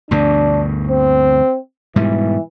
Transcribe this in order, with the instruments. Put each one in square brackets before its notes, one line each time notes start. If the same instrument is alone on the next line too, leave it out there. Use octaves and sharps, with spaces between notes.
[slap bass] D2 G2 B2 [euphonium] D4
[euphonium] C4
[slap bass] G#2 B2 G3 [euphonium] E3